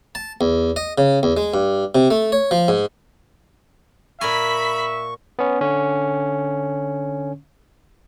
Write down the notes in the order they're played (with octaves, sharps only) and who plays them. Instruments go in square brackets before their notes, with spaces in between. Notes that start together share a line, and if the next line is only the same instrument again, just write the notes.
[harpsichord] A5
E2
D#5
C#3
E2
G#3
G2
C3
A3
C#5
F3
G#2
[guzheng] A#2 A#4 G#5 [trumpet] E5 [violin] B5 B6 [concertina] C#6
[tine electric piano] B3 C#4
D3 C#4